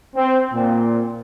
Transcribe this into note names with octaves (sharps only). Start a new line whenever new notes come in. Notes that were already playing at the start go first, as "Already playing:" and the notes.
C4
A#2